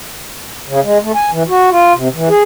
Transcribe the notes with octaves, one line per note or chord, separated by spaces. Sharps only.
C#3
G#3
A3
G#5
E3
F#4
F4
C3
E3
G#4